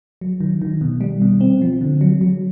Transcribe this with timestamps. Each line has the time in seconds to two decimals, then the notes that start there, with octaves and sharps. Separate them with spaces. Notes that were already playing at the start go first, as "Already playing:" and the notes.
0.21 F#3
0.41 D#3
0.62 D#3
0.81 B2
1.01 G3
1.22 B2
1.41 C4
1.62 F3
1.81 D3
2.01 F#3
2.21 F#3